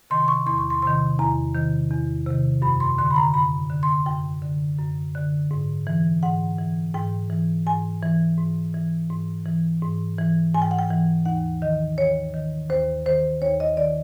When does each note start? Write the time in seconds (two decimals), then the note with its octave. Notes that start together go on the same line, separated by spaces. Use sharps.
0.10 C3 D#3 C6
0.22 C6
0.28 C#6
0.46 E2 C6
0.58 C#6
0.70 C6
0.82 C3 D#3 C6
1.19 E2 A#5
1.55 C3 D#3
1.91 E2
2.26 C3 D#3
2.62 F#2 B5
2.80 C6
2.98 D3 C6
3.10 B5
3.16 A#5
3.34 F#2 B5
3.70 D3
3.83 C6
4.06 F#2 G5
4.42 D3
4.78 F#2
5.15 D3
5.51 G#2
5.87 E3
6.23 G#2 F#5
6.59 E3
6.94 G#2 G5
7.30 E3
7.66 G#2 G#5
8.03 E3
8.38 G#2
8.74 E3
9.10 G#2
9.46 E3
9.82 G#2
10.19 E3
10.54 G#2 G#5
10.62 G5
10.71 F#5
10.79 G5
10.91 E3
11.25 D#2 F#5
11.62 D#3 D#5
11.97 D#2 C#5
12.34 D#3
12.70 D#2 C5
13.06 D#3 C5
13.42 D#2 C#5
13.60 D#5
13.77 D#3 D5